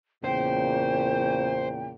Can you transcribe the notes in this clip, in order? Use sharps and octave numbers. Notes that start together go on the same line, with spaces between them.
E2 A#2 C#3 C5 G5